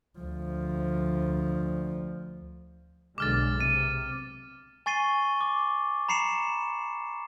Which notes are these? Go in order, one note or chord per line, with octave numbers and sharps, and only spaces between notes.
D2 F3
B1 D3 G#3 D6 F6 A6
C3 D#7
G#5 C#6 A6 C7 D#7 G7
D6
A#5 B5 C7 C#7 E7